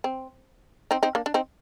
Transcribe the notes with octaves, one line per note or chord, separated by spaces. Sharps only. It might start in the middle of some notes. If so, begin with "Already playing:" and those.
C4
C4 D#4
C4 D#4
A#3 D4
D4
C4 D#4